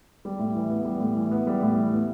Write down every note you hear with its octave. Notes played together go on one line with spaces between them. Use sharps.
G3
A2
E3
B3
G3
A2
E3
B3
G3
A2
E3
B3